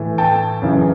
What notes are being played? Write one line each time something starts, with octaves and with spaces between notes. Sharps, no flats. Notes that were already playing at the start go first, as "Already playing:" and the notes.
Already playing: A2 E3
G5 A5
F#2 C#3 E3